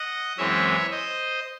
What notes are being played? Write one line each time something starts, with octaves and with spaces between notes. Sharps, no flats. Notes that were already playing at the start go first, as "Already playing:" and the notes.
Already playing: D#5 F#5
F#2 E3 G#3 C4 C#5 E5
C5 D#5